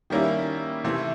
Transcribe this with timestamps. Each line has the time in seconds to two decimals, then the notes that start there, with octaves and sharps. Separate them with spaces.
0.10 D#3 G3 A#3 C#4 E4
0.84 C3 E3 A3 C4 E4